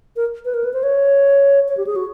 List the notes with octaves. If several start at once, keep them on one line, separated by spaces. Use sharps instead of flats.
A#4
B4
A#4
B4
C5
C#5
C#5
G4
G#4
F#4